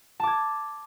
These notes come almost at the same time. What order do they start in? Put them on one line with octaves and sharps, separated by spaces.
A5 D6 G#6